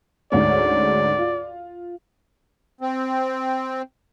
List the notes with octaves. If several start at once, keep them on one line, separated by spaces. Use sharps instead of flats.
D2 G#2 C#4 D5
F4
C4